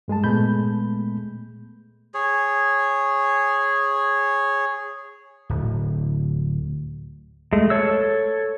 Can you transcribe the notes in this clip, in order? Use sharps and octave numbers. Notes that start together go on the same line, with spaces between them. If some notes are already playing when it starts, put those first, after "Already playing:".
G2 G#3 G#4 A5
A#2 G#3 A3 B3 B5 G6
G#4 C#5
D1
G#3 A3
A4 C#5 E6